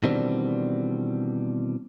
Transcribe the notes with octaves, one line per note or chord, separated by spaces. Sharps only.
B2 D#3 E3 G3 C4 D4